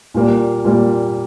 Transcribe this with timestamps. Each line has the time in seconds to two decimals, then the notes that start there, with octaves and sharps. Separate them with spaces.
0.14 A#2 G3 A#3
0.64 A#2 G3 A#3